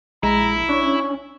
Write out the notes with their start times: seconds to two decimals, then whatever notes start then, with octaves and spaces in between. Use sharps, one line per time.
0.23 A#1 G#3 E4 A#5
0.69 C#4 D4 C#5